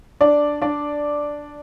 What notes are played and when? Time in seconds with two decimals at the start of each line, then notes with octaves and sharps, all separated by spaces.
0.21 D4 D5
0.62 D4 D5